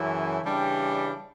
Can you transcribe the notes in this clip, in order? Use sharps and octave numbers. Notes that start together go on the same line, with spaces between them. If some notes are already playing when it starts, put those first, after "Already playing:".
Already playing: F#2 C#3 E3 A3 E4
C#3 E3 G3 D4